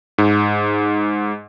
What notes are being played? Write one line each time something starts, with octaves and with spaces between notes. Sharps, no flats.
G#2